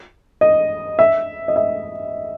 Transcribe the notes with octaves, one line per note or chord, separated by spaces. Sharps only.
D#5
E5
D#5
E5